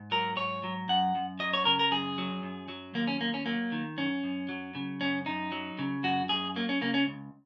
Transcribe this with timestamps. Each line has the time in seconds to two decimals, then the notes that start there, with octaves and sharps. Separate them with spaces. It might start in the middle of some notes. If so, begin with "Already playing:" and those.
Already playing: G#2
0.11 F#3 A#4
0.37 G#2 C#5
0.63 F#3
0.88 F#2 F#5
1.15 F#2
1.39 F#3 D#5
1.53 C#5
1.65 C#3 A#4
1.79 A#4
1.91 F#2 G#4
2.18 F#3
2.43 F#2
2.68 F#3
2.94 D#2 A#3
3.07 C#4
3.20 D#2 A#3
3.34 C#4
3.46 F#3 A#3
3.72 D#3
3.97 F#2 C#4
4.24 F#2
4.49 F#3
4.75 C#3
5.01 F#2 C#4
5.26 F#2 D#4
5.52 F#3
5.79 C#3
6.03 F#2 F#4
6.29 F#2 G#4
6.56 F#3 A#3
6.69 C#4
6.81 C#3 A#3
6.94 C#4
7.06 C#2